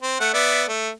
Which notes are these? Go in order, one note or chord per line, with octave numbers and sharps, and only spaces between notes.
C4
A3 F#5
B3 D5 E5
A3